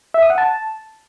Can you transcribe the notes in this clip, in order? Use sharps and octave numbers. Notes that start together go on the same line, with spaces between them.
E5
D#6
F#5
A5